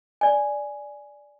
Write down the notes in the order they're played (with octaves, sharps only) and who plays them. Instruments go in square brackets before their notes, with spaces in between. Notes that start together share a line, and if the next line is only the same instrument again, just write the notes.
[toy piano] D5 G#5